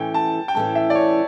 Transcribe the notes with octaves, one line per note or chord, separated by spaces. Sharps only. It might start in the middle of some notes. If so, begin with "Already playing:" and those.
Already playing: A2 E3 A3 C#4 G5
A5
G5
A2 E3 A3 C#4 A5
E5
D5
C#5